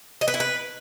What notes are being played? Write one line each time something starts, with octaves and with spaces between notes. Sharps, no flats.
D#5
B4
E4
B4